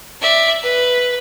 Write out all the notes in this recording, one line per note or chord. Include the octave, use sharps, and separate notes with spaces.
D5 E5
B4